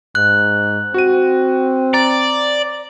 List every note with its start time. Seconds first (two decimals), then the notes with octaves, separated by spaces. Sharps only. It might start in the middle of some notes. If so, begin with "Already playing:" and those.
0.15 G#2 F#6
0.94 C4 F#4 D#7
1.94 D5 A#5